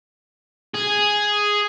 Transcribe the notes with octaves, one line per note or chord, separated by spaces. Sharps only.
G#4